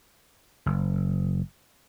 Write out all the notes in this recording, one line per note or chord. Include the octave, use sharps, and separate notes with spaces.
F#1